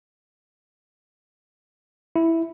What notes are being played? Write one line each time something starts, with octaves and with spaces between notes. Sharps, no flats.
E4